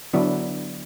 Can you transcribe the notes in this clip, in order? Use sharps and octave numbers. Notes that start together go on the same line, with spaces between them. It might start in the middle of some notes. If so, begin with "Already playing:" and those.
D3 F#3 B3 D4 E4